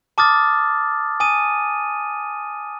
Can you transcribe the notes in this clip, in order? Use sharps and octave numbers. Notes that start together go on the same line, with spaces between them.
A5 D6 D#6 F6 A6
G#5 D#6 D#7